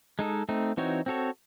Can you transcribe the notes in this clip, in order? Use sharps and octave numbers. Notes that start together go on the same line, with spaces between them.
G#3 D#4 A4
A3 C4 D#4
E3 C4 D#4 F#4 C#5
C4 F#4 A4 C#5